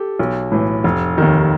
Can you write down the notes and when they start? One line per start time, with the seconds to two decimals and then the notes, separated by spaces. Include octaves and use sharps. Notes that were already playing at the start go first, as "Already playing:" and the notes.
Already playing: G4 A4
0.19 B1
0.52 A2 E3
0.84 F1
1.18 D#2 D#3